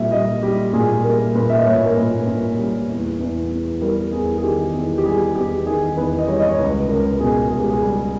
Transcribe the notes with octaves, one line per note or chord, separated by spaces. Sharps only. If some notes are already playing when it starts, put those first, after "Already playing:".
Already playing: A#2 G3 E5
G3 D#5
G3 G4
A#2 G#4
G3 A#4
A#2 B4
E5
D#5
A#2 C#5
A#4
A#2 B4
A#2
G3
E2
E2
E2
G3 A#4
E2 G#4
G#4
D#3 G4
E2
G4
G3 G#4
E2 G4
D#3 G#4
E2 B4
D#5
G3 C#5
D#5
C#5
C#2 B4
C#2 A#4
B2 G#4
C#2 G#4
G4
G#4
G3